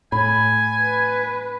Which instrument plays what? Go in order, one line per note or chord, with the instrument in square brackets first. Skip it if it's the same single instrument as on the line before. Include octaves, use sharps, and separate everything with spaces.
[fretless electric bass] A2 [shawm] G#5 [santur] B5
[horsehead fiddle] B4